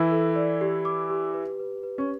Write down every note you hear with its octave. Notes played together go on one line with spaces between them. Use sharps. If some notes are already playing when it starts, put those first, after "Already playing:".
Already playing: E3 E4 A4
A4
D5
G4
D6
G4
B4
B4
B4
C#4